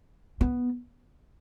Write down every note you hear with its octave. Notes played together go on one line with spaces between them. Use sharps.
B3